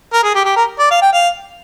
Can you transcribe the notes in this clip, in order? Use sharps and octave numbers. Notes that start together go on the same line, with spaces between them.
A#4
G#4
G4
G4
A#4
D5
F5
G5
F5